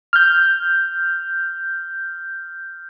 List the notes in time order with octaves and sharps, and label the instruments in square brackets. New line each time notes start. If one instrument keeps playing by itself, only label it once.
[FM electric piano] F6 G6